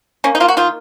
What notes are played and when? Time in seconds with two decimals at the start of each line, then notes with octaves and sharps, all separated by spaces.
0.24 A#3 C#4
0.35 D#4
0.40 A#3 F4
0.48 F#4
0.57 D#3 F4